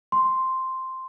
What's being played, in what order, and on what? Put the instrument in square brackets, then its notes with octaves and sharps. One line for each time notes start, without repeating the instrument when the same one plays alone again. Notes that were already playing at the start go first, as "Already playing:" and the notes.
[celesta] C6